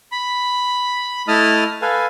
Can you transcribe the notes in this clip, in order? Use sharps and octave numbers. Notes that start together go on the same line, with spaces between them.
B5
A3 E4 D#5 A5 D#6 F6
A4 B4 F5 G#5